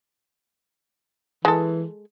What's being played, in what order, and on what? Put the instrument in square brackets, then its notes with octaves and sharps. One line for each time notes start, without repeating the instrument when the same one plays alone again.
[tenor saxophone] E3 [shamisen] G#3 A4